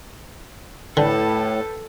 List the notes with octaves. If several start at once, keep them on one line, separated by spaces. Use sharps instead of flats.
A2 D3 A4 B4 G5 A5